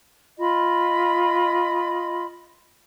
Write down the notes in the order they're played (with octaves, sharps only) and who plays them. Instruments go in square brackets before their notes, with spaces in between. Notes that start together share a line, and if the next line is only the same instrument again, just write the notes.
[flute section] F4 D#5 B5